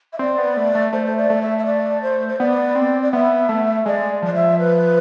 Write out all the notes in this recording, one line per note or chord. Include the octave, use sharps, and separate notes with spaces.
E5
C4 D5
B3
A3
A3
A3 C5
C5
D5
A3
E5
E5
D5
C5
C5
B3 D5
C4
D5
B3 E5
A3
G#3 D5
F3 D5
E5
B4